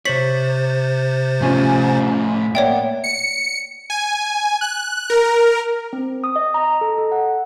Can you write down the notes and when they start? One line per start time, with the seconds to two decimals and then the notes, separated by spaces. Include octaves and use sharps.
0.05 C3 C5 C#5 A6 B6 F#7
1.41 A2 F3 C#4 F4 G#5
2.55 A#3 B3 C#5 D5 E5 G5
3.04 C#7
3.90 G#5
4.61 F#6
5.10 A#4
5.93 C4
6.24 D#6
6.36 D#5
6.54 A#5
6.81 A4
6.98 A4
7.12 F#5